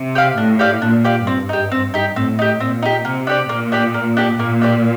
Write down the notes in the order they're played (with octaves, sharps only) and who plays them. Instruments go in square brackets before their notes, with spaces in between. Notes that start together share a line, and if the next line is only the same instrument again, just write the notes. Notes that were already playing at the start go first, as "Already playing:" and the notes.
Already playing: [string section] C3
[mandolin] G4 D5 F5
[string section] A2 [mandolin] D4
[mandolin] G4 D5 F5
[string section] A#2 [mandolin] D4
[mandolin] G4 D5 F5
[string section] G2 [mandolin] C4
[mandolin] D#4 G4
C4
D#4 G4
[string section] A2 [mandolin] C4
[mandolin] D#4 G4
[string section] A#2 [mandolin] C4
[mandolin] D#4 G4
[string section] C3 [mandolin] A#3
[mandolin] D4 G4 D5
[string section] A#2 [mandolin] A#3
[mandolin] D4 G4 D5
A#3
D4 G4 D5
[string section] A#2 [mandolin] A#3
[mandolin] D4 G4 D5